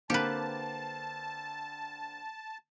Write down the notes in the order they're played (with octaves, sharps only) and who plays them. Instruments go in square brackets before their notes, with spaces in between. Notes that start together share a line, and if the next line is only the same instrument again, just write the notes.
[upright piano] D3 A#3 C4 [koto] G4 B4 [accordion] A5